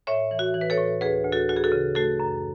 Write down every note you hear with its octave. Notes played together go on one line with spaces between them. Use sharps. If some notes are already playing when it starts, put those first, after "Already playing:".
A2 C#5 E5
E3
F#4
E3
B4
A4 C#5
A2
D2 G#4 B4
D2
F#4 A4
D2 F#4
G#4
F#4 A4
C#3
A3 F#4 A4
F#2